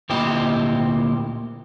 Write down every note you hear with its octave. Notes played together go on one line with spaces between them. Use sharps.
D2 A#2 C4 E4 G4 D#5